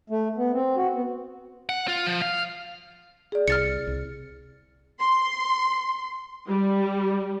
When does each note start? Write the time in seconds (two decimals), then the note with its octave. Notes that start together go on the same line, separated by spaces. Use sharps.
0.10 A3
0.37 B3
0.53 C4
0.77 F#4
0.94 B3
1.69 F#5
1.88 F4
2.07 F3
2.22 F5
3.32 G#4 D5
3.48 C2 F6 A6 C#7
3.87 C2
5.00 C6
6.49 G3